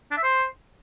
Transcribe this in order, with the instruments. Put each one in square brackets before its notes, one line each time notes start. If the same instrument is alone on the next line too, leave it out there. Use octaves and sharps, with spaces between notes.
[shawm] D4
E5
C5